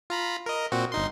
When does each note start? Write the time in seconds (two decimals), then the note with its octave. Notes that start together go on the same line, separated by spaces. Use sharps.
0.10 F4 A#5 B5
0.46 A#4 D#5
0.72 A#2 C4 F#4
0.92 G1 D#4 C6